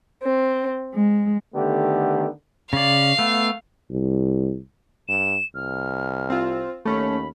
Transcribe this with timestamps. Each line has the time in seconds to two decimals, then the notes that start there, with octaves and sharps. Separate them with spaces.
0.23 C4
0.95 G#3
1.55 D3 D#3 A3 B3 G4
2.73 C#3 D5 F5
3.19 A3 B3
3.91 C2
5.08 G2 E7
5.55 C2 F6
6.30 C4 F4
6.85 D#2 A3 C#4 B5